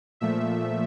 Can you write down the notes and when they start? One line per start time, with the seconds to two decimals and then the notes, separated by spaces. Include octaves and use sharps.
0.20 A#2 F3 A3 E5